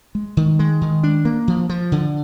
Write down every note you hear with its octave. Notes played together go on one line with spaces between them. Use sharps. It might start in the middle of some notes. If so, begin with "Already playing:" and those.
G#3
D#3
G#3
D#3
D4
A#3
F3
F3
D3